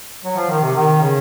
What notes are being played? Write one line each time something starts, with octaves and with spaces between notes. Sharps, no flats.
F#3
F3
D#3
C3
D#3
C#3